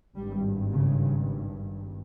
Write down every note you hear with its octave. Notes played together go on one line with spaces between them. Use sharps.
G#1 G2 G3
C#3